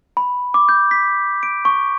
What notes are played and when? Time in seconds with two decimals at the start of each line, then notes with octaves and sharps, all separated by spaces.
0.17 B5
0.54 D6
0.69 G6
0.91 B6
1.43 D7
1.65 C#6